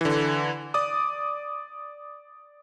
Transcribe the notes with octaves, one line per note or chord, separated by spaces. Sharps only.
D3 E3
D5 D6 D#6